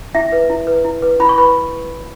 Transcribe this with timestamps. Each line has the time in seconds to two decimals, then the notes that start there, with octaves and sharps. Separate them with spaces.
0.15 E4 E5
0.32 B4
0.50 E4
0.67 B4
0.85 E4
1.02 B4
1.20 E4 B5
1.29 C#6
1.38 B4 B5